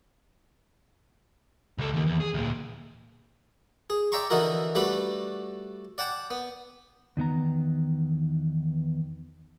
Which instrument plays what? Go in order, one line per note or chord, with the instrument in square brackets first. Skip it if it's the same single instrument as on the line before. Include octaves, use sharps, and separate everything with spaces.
[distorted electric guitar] C#2 A4
D#2 D#3
E2
G#4
D2 A#2
[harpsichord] G#4
D5 E5 G5 A#5 C6 C#6
D3 E3 D#4 E4 F#4 A#4
G3 A3 D4 F#4 B4
D5 F#5 G5 A5
B3
[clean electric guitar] E2 D#3 B3 A#5